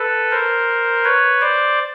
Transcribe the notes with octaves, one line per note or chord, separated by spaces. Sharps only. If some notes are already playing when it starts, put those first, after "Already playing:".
Already playing: A4 B4
A#4 C5
B4 C#5
C5 D5